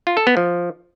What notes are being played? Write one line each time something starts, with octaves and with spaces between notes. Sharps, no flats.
F4
A4
B3
F3